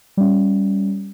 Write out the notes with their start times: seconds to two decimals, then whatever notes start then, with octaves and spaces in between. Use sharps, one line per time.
0.17 G3 C#4